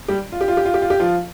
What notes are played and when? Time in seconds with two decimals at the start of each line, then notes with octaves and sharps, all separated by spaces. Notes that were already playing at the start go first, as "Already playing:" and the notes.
0.08 G3 G4
0.32 F4
0.41 G4
0.48 F4
0.57 G4
0.65 F4
0.74 G4
0.82 F4
0.90 G4
1.00 F3 F4